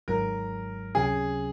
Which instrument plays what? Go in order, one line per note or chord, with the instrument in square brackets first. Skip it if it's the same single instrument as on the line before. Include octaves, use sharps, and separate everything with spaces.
[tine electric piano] G#1 G#2 F#3 [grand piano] A#4
[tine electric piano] C#2 C3 F#3 C#4 [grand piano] G#4